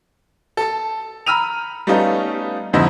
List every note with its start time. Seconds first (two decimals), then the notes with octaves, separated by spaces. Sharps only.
0.57 A4 A5
1.26 A#5 B5 E6 F6 D#7 F7
1.87 G3 A3 B3 C#4 D#4 F4
2.73 F2 G#2 D3 E4 C5 D#5